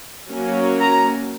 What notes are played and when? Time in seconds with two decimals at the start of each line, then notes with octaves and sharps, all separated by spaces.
0.30 F#3 A#3 C#4
0.80 A#5